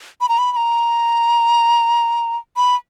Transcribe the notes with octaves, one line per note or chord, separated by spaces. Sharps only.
B5
A#5
B5
B5
A#5
B5